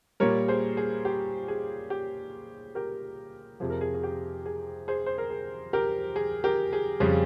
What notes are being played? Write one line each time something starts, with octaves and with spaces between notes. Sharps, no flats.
A#2 G3 A#4 C#5
G#4 C5
G#4
G4
G#4
G4
G4 A#4
F2 C3 F3 G#4
A#4
G#4
G#4
G4
G#4
G#4 C5
C5
A#4
G#4
G4 A#4
G#4
G4 A#4
G#4
F2 C#3 G3 G#4